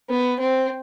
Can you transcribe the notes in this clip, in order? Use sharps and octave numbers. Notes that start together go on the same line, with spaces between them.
B3
C4